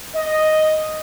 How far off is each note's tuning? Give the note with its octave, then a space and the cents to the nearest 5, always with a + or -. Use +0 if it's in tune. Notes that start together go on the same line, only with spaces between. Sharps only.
D#5 +0